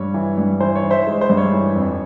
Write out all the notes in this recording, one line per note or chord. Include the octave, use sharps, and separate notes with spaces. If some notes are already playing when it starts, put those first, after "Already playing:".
Already playing: G2 C#5
E3
G2
E3 C5
C#5
E3
C5 E5
G#3
C5
G2
C#5
E3
F2